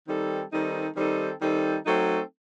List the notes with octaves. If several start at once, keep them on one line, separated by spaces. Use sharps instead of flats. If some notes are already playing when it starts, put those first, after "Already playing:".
D#3 G3 C4 D#4 A4
D#3 G3 C4 D#4 A4
D#3 G3 C4 D#4 A4
D#3 G3 C4 D#4 A4
F#3 A3 C4 D#4 A4